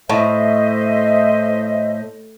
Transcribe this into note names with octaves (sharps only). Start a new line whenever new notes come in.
A2 C5 D#5 E5